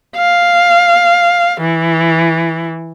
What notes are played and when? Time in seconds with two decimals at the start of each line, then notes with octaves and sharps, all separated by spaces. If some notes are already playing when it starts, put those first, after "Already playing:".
0.16 F5
1.61 E3